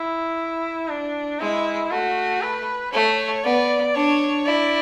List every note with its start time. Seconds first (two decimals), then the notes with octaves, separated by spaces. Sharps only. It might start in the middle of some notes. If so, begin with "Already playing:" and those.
Already playing: E4
0.88 D4
1.40 G#3 E4
1.91 A3 F#4
2.42 B4
2.93 A3 C#5
3.44 B3 D5
3.94 D4 C#5
4.46 E4 D5